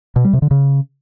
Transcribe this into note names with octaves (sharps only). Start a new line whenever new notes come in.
B2
G3
C3
D3
C#3